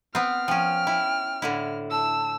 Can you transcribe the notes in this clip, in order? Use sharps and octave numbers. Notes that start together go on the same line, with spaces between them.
B3 C4 F6
F3 C#4 G5
E4
A2 D3 E4
A5 E6